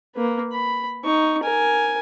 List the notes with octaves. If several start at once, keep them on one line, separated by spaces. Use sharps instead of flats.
A#3 B4
B5
D#4 C#6
A#4 G#5